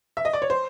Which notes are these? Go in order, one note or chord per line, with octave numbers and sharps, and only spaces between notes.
E5
D#5
D5
C#5
C5